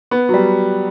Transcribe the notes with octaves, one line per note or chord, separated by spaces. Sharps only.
B3
F#3
G3